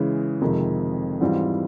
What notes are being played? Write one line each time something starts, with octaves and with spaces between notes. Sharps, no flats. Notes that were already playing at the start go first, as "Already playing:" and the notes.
Already playing: C#3 E3 G#3
F2 C3 D#3 G#3
G#2 E3 G3 C4 F4